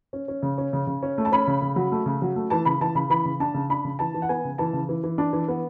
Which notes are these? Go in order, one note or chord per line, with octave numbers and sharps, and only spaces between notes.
C#4
C#4
C#3
C#4
C#3
C#3
C#4
A3
A5
C#4 B5
C#3
C#3
F#3
A3
C#3
F#3
A3
E3 A5
C#3 B5
E3 A5
C#3 B5
E3 B5
C#3
D4 A5
C#3
D4 B5
C#3
E3 A5
E3
F#5
B3 G#5
C#3
E3 A5
C#3
E3
E3
D4
E3
B3